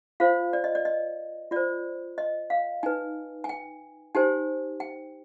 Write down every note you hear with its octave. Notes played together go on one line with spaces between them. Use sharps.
F4 C5 F5
D5
D#5
D5
D#5
F4 C5 D5
D#5
F5
D#4 B4 G#5
G#5
G5
D#4 G4 C5 G#5
G5